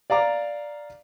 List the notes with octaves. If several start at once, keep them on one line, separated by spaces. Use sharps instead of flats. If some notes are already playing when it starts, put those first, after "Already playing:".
D5 F5 A#5 D6